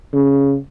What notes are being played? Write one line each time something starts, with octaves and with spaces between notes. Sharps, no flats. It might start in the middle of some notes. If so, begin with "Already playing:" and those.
C#3